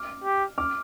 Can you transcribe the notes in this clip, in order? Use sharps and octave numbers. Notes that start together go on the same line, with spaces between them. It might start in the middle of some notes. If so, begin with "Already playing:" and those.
Already playing: D6 F6
G4
D6 F6